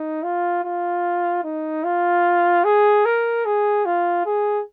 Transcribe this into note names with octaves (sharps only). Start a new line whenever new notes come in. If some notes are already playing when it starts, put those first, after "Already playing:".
Already playing: D#4
F4
F4
D#4
F4
G#4
A#4
G#4
F4
G#4